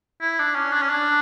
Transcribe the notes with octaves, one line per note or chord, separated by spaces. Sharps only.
E4
D4
C#4
D4
C#4
D4